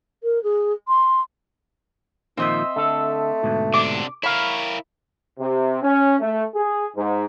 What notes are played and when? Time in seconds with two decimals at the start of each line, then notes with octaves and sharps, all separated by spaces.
0.23 A#4
0.43 G#4
0.88 C6
2.37 A#2 D#3 F3 C4 D#5 E5
2.76 D3 A3 A4
3.43 D2 G#2 B2
3.74 C3 D4 D6
4.23 E4 A#4 C#5 F5 B5
5.38 C3
5.82 C#4
6.20 A3
6.55 G#4
6.95 G#2